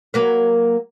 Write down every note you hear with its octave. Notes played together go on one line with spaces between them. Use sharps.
F#3 A#3 B4